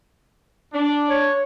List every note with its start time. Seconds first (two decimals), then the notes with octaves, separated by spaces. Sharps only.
0.73 D4
1.09 C#5